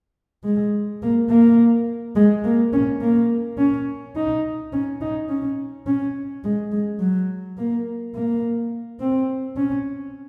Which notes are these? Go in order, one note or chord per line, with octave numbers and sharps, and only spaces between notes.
G#3
A#3
A#3
G#3
A#3
C#4
A#3
C#4
D#4
C#4
D#4
C#4
C#4
G#3
G#3
F#3
A#3
A#3
C4
C#4